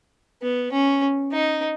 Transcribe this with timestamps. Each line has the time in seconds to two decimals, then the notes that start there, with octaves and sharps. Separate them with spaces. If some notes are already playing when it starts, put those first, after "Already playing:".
0.42 B3
0.72 C#4
1.32 D#4